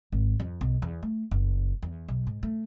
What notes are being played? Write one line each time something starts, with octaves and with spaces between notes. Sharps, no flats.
G#1
F2
B1
E2
A3
F#1
E2
B1
G#2
A3